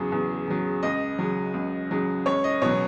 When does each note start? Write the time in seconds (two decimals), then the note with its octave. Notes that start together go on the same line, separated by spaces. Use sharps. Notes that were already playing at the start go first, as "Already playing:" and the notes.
Already playing: E2 C#3 F#3
0.12 E2
0.48 C#3 F#3
0.83 C#2 D#5
1.19 C#3 F#3
1.54 C#2
1.91 C#3 F#3
2.26 C#2 C#5
2.44 D#5
2.62 B2 F#3 C#5